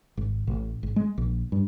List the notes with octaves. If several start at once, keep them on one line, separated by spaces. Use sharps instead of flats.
G#1
A1
G#1
G#3
A#1
G2